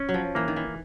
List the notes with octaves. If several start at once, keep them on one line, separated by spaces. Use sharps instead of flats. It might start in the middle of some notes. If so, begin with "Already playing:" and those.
Already playing: C#4
F#3
F3
E3 A#3
D#3
E3